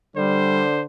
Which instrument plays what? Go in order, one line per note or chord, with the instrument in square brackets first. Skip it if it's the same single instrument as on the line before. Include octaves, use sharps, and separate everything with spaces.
[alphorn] D3 [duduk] G3 [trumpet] C5